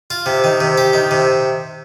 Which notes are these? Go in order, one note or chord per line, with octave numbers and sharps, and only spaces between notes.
F4
C3
D#3
C3
G4
D#3
C3